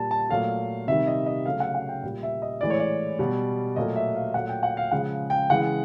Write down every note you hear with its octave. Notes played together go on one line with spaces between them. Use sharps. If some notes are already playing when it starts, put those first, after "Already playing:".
Already playing: A#2 G3 A5
A5
A#2 F#3 A3 F5
C3 D#3 G3 E5
D#5
D#5
C#3 F#3 A3 F5
F#5
F#5
G5
A#2 G3
E5
D#5
A2 E3 G#3 D5
C#5
D5
B2 G3
A#2 F#3 A3 D#5
E5
F5
A#2 F#3 A3 F#5
G5
F#5
F5
C#3 F3 G#3 F#5
G5
C#3 E3 G#3 F#5